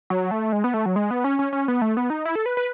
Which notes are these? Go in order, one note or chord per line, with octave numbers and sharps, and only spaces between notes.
F#3
A3
G#3
B3
A3
F#3
G#3
B3
C#4
C#4
C#4
B3
A3
B3
D#4
E4
A4
B4
B4